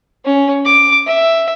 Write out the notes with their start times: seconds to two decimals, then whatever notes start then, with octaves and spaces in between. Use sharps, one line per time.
0.25 C#4
0.65 D6
1.07 E5